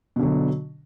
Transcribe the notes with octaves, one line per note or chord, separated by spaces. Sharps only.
B2 D3 F#3